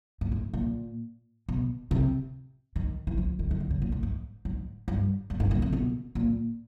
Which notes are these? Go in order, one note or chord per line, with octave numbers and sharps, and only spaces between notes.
A2
G#2
A#2
B2
C3
D#3
E3
F3
D#3
D#3
D3
C#3
A#2
A2
G#2
G#2
G2
G2
G#2
A#2
C3
B2
A#2